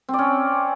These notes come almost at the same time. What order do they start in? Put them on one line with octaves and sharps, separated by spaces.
C4 D5 C#4